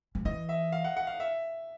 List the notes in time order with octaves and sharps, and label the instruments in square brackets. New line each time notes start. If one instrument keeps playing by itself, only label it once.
[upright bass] F3
[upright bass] E3 [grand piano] D#5
[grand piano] E5
F5
F#5
F#5
F5
E5